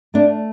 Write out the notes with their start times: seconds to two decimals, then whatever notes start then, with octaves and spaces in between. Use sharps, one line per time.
0.14 A3 D4